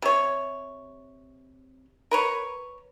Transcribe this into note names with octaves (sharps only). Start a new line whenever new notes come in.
C3 C#5
A#4 B4 C#5